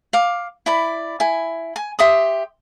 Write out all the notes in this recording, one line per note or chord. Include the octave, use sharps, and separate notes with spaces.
F5 D6
E4 D5 B5
E4 G#5
G#5
G4 E5 C6 D#6